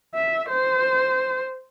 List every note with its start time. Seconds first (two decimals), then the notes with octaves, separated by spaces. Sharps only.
0.15 E5
0.49 C5